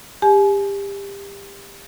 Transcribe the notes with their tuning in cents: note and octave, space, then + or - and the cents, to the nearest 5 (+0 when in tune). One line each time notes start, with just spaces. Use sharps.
G4 +25 G#5 +35